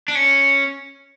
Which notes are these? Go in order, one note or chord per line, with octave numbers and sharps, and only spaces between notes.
D4
C#4